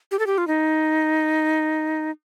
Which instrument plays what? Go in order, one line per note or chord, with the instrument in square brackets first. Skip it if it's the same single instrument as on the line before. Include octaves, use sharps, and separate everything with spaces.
[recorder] G4
A4
G4
F4
D#4